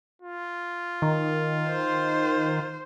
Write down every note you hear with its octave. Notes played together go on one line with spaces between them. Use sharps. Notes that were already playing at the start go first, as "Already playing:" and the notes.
F4
D#3
C5